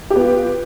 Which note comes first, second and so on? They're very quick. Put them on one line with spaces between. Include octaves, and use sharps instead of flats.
G4 B3 F4